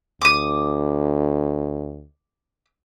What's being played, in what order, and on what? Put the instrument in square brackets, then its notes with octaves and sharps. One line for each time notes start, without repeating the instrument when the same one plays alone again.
[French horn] D2 [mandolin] D6 D#6